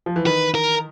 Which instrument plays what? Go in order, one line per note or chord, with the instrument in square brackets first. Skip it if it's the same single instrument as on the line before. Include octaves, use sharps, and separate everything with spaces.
[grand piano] F3
E3
[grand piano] D#3 [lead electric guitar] B4
[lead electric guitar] A#4